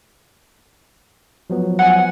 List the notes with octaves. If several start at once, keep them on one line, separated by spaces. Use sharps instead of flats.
F3 F#3 B3
F#5 G#5